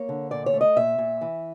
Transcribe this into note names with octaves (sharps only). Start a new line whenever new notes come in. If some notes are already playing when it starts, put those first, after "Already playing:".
Already playing: A#3 C#5
D3
A#2 D5
C#5
A3
D#5
A#2 E5
A#2
E3